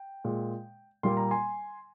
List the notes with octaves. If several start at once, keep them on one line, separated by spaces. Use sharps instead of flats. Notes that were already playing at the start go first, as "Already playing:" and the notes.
Already playing: G5
A#2 G#3
A#2 G3 A#3 C6
A#5
G#5 C6